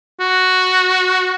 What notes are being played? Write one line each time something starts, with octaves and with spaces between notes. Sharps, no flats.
F#4